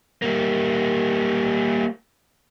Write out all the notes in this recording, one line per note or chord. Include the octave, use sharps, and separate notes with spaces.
G3 A#3